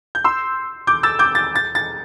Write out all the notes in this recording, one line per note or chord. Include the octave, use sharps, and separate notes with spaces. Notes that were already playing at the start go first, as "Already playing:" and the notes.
G6
C6 E6
D6 G6
E6 A6
D6 G6
A6
A6
A6